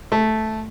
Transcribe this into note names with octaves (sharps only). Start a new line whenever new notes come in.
A3